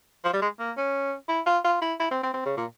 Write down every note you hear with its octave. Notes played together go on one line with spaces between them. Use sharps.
F3
G3
G#3
A#3
C#4
E4
F4
F4
E4
E4
C4
C4
C4
C#3
A#2